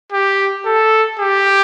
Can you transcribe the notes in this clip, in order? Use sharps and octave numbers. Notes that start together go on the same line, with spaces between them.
G4
A4
G4